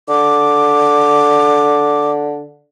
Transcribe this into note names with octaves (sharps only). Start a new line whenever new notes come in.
D3 D6